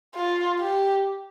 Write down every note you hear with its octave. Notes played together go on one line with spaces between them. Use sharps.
F4
G4